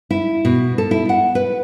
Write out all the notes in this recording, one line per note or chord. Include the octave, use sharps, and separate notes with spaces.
E4
B2
A4
E4
F#5
B4